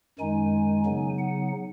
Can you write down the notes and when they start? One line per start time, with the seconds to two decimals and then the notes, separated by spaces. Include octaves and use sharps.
0.19 F#2 D#3 G#3 D#4 G#5
0.85 C#3 F#3 B3 D#4
1.19 F#5